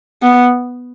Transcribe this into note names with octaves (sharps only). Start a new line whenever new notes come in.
B3